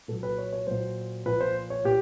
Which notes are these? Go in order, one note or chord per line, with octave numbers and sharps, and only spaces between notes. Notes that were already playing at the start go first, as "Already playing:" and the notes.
A#2 F#3 A4
B4
C#5
C#5
A#2 F#3 C5
A#2 F3 B4
C5
C#5
A#2 G4